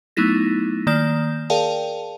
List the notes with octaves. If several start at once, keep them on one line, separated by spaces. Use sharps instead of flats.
F#3 A3 B3 D#4 E4 A#6
D#3 A#3 D5 G6 E7
G#4 A#4 D5 F5 G5 A5